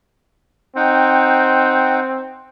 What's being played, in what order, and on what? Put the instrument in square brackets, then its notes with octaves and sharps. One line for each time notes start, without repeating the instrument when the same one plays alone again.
[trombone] C4 [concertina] D#4 F#5 G5